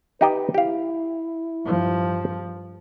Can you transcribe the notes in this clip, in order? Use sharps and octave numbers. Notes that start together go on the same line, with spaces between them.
D#4 G4 B4 D#5
E4 G4 F5
G2 F3